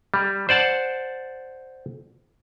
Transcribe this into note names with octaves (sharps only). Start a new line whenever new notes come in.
G3
C5 D5 F#5 A5